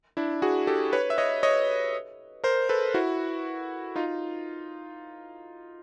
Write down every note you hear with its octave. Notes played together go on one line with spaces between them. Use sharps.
D4 E4
F#4 G#4
G4 A4
B4 C#5
E5
C#5 D#5
C#5 D#5
A#4 C5
A4 B4
E4 F#4
D#4 F4